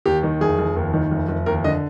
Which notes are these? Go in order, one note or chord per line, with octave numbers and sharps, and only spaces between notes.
D#2 G4
D#3
F1 G#4
F1
D#2
D#3
F1
F1
D#2 A#4
D3 D#5